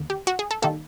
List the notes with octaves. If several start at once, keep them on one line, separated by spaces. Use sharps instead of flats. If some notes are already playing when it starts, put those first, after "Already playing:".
Already playing: D#2 D3 A#3
G4
F#4
G#4
A4
D#3 G3 A#3 A4